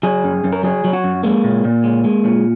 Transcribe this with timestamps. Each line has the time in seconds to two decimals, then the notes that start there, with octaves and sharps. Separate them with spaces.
0.03 F#3 G#4
0.24 F#2
0.44 F#2
0.53 A#4
0.63 F#3 G#4
0.84 F#3
0.93 F#4
1.04 F#2
1.23 G#3 A#3
1.44 A#2
1.65 A#2
1.84 G#3
2.04 G#3
2.25 A#2